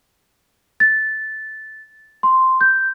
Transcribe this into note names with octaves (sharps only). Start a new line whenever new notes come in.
A6
C6
G6